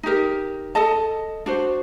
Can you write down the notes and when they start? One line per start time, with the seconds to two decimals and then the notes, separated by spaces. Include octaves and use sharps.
0.03 D#4 G4 A#4
0.75 A4 D#5 A5
1.46 D4 F#4 C5